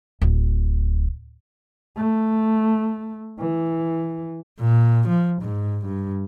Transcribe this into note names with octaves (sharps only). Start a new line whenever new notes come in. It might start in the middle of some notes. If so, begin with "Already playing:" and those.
D1
A3
E3
A#2
F3
G#2
G2